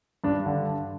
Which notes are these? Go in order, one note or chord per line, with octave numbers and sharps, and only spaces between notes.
G2 D4
D3